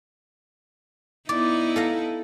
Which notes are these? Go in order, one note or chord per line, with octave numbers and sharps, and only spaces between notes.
B3 D#4 E4 D5
A4 F5 A#5